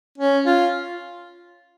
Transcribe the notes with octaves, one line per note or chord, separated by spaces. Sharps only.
C#4
F4